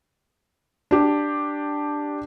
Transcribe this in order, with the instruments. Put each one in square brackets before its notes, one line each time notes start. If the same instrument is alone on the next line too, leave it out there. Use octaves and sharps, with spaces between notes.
[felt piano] D4 G4